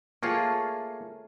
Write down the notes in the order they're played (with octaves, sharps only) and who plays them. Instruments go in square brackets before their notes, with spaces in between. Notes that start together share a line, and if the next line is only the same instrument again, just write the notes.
[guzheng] A3 C#5 G5 [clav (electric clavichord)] A#3 F4 G#4